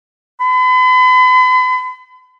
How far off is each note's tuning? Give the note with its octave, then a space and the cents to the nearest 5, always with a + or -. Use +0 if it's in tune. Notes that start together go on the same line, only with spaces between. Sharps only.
B5 +40